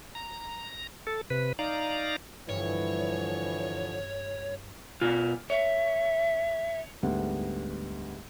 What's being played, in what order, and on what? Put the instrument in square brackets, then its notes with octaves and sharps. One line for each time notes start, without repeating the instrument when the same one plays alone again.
[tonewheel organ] A#5
A4
C3 B4
D#4 D5 F5 A#5
[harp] G2 [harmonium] D3 F3 [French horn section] E3 [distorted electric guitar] C#5
[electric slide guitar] B2 F4
[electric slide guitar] C#5 [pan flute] E5
[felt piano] D2 G#2 G3 B3 F#5